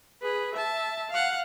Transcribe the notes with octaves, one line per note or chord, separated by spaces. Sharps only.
G#4 B4
E5 A5
F5 F#5